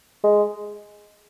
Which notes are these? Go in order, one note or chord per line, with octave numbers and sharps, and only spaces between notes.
G#3